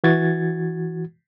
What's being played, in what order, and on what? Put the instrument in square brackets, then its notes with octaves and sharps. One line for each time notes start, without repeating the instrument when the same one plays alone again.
[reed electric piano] E3 F#4 G#6 A6